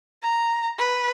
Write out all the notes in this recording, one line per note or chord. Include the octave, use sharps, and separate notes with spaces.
A#5
B4